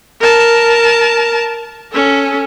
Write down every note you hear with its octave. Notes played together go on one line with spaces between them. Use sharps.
A#4 A5
C#4 A4